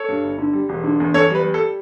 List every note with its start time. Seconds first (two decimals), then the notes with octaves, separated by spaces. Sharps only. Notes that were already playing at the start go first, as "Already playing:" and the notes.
Already playing: A4 C#5
0.08 G2
0.24 G1
0.38 D3
0.53 G3
0.69 E1
0.84 D3
1.00 E2
1.14 E2 A4 C#5
1.30 G3
1.35 B4
1.44 G3
1.54 A4